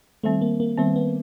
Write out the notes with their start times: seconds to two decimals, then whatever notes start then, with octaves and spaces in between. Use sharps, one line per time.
0.23 D#3 G3 A3 C4
0.41 A#3
0.60 A#3
0.77 D#3 G3 B3 C4
0.96 B3